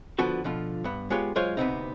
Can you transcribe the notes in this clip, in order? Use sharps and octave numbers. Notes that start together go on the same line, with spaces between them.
D3 F3 B3 F#4 B4
B2 D3 F3 F4
G2 B3
G#3 B3 F4 G4 C#5
F#3 G#3 F4 C5 C#5
D2 C3 F3 B3 C4 D#4